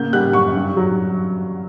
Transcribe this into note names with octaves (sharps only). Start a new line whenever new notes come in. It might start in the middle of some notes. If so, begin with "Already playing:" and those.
Already playing: C#3 A#3 G6
G3 F#6
F#2 C#6
G2
F#3